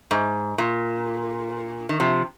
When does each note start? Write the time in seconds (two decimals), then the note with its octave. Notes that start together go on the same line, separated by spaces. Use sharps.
0.11 G#2
0.58 A#2
1.89 D#3
2.00 C3 F3